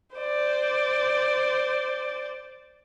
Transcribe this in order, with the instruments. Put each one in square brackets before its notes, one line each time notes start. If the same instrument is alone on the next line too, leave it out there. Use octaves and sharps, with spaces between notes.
[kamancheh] C5 D5